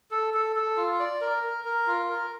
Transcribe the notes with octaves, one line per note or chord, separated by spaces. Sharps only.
A4
A4
A4
F4
D5
A#4
A#4
A#4
F4
A#4